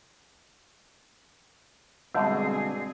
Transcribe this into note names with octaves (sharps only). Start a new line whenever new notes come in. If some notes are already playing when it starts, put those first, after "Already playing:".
B2 D3 G3 G#3 C4 G#4 F5